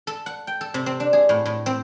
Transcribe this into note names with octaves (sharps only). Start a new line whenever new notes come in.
A4
F#5
G5
A4
C3
C4
D4
G#4
A2
A2
C4